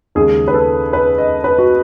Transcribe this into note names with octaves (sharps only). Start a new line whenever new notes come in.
D#2 C#3 G#3 G#4
B4
A4
B4
D#5
B4
F#4